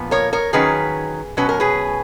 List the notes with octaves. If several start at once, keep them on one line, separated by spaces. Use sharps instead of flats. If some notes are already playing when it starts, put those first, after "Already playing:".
Already playing: A#2 F3 B3
A#4 C#5
A#4 C#5
D#3 F#3 C#4 G#4 B4
B2 F#3 C#4 B4
A#4
G#4 B4